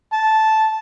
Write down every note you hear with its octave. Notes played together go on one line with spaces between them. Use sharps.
A5